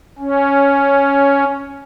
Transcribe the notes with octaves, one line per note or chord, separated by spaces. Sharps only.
C#4